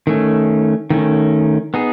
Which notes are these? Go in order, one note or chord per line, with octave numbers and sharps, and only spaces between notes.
D#3 A3 C#4
D#3 A3 C#4
B3 D#4 G#4